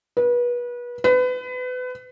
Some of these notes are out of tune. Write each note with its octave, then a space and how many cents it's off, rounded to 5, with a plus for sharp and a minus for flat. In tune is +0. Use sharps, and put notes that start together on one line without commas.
B4 -30
B4 +30